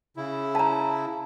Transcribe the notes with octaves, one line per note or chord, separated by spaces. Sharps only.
C#3 E4
A5 A#5